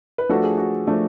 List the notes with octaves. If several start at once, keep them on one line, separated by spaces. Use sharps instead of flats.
B4
F3 A3 D4 F#4 A4
G#4
F#4
F3 A3 D4